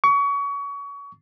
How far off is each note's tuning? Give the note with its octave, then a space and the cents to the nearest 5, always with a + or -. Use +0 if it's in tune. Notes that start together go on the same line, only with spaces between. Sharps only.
C#6 +30